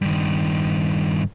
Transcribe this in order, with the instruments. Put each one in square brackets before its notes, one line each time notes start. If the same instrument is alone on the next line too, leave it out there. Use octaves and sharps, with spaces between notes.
[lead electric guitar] G2 D#3